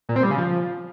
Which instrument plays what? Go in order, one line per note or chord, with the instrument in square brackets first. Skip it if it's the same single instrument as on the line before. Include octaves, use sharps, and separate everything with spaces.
[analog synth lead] A#2
C4
G3
C#3
F3